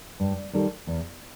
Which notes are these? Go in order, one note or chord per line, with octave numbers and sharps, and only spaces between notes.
G2
D#3 G3 D#4 A4
E2